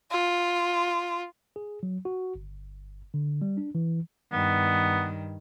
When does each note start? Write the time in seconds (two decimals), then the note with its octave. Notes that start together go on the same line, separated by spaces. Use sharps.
0.11 F4
1.56 G#4
1.83 F#3
2.05 F#4
2.35 G1
3.14 D3
3.42 G3
3.57 D4
3.75 E3
4.33 G2 D#3 B3